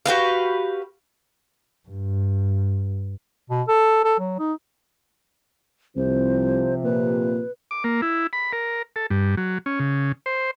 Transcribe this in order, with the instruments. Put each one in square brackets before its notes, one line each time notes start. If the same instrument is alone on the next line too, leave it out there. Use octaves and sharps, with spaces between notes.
[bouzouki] F#4 G4 B4 F5
[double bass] G2
[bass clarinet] B2
A4
A4
F#3
D#4
[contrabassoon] C2 [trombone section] C3 F3 [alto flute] C5
[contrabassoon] A#2 [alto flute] B4
[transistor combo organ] D6
A#3
E4
B5
A#4
A4
G2
F#3
C#4
C#3
C5